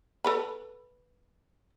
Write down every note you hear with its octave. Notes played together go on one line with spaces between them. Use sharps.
A4 B4 B5